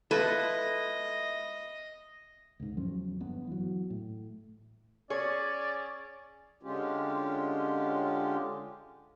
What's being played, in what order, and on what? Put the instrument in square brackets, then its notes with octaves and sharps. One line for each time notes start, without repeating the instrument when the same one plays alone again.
[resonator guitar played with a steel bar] G#3 F4 A4 [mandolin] E4 [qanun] B4 [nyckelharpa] D#5
[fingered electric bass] C#2 G#2
E2 F3 F#3 C#4
G1 B3
E3 F#3
A2
[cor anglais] C#4 [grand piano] G#4 [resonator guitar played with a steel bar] C#5 [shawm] D5
[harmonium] D3 G#3 C#4 F4 G4